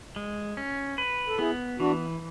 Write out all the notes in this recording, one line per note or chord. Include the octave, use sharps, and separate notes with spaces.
G#3
C#4
B4
A4
B3 E4 G#4
E3 D4 F#4